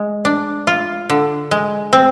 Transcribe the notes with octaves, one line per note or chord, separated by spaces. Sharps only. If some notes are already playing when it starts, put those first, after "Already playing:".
Already playing: G#3
D4
F4
D3
G#3
C4